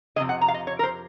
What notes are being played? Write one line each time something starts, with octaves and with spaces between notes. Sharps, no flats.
F2 C3 D#3 G#3 D#5
F#5
A#5
F5
D#5
C#5
A#4
C5